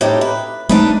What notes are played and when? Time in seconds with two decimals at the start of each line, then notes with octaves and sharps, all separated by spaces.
0.01 A2 D#4 G4
0.21 B4
0.69 G#3 A3 D4 D#4 B4